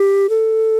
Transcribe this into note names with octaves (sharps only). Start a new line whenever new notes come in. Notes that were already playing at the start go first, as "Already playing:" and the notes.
Already playing: G4
A4